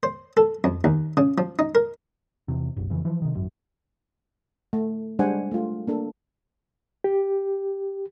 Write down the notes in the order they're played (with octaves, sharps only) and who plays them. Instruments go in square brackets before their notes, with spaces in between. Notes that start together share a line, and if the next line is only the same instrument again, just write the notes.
[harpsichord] C5
A4
F2
D#2
C#3
F3
D#4
A#4
[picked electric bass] E2 C3
F#1 B1
F2 C#3 E3
E3 F3
C3 D#3
G#1 F#2
[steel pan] A3
G3 G#3 D4 C5 F#5 G#5
A3 D4 F4
A#3 D4 A4
[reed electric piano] G4